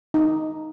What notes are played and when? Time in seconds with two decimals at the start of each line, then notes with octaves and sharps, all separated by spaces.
0.14 D#4